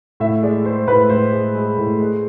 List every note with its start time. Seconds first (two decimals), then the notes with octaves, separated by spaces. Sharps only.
0.20 A2 E5
0.43 G#3 D5
0.65 G#3 C5
0.87 A2 B4
1.10 A2 C5
1.32 G#3
1.55 G#3
1.77 A2
2.00 G#3